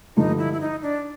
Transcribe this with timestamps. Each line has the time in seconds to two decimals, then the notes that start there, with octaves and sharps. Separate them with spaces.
0.17 G2 D3 F3 D#4
0.39 E4
0.53 E4
0.60 D#4
0.82 D4